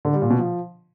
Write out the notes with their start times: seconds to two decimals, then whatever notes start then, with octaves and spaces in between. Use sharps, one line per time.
0.05 D3
0.13 G3
0.22 A#2
0.30 B2
0.39 F3